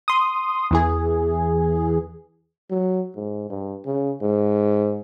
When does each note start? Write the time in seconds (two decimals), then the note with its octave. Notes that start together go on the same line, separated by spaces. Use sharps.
0.08 C6 D#6
0.71 E2 E3 G#4
2.71 F#3
3.16 G#2
3.50 G2
3.86 C#3
4.22 G#2